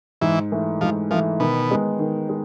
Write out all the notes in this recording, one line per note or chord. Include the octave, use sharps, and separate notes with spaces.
G#2 E3
E3 A3
G#2 F3
E3 F3 A3
B2 D#3
G#3 B3 D#4
D#3
G#3